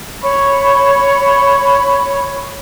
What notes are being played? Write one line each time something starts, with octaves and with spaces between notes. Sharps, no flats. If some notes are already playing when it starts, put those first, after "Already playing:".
C#5 B5 C#6